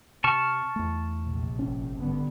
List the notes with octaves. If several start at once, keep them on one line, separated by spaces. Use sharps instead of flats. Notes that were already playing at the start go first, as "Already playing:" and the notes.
C3 A5 C#6 F6
E2 A3
A#1 C3
G1 C#4
G2 D3 B3